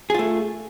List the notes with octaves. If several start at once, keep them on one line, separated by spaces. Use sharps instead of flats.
A3 F4 G#4